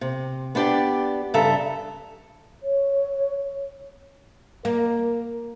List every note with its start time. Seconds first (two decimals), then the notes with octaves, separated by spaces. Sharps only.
0.01 C3
0.55 B3 D4 G4 D5
1.34 G2 C#3 A4 E5 A#5
2.63 C#5
4.65 A#3 A#4